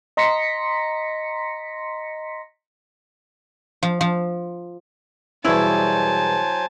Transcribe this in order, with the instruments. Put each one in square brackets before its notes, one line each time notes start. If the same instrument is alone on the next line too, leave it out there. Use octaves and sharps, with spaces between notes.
[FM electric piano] D#5 A#5 C6 A#6 B6 C#7
[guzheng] F3
F3
[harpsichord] E2 G2 B2 [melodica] F#3 C5 G#5 [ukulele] E4 [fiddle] A5